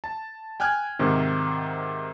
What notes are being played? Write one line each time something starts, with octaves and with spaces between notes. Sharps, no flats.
A5
G5 G#5 F6 F#6 G#6
G#2 C3 D#3